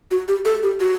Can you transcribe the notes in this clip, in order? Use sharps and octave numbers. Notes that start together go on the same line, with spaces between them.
F#4
G4
A4
G4
F#4